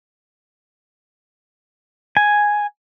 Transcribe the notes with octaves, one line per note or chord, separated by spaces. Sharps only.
G#5